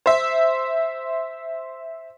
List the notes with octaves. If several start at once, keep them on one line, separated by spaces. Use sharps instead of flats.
C5 E5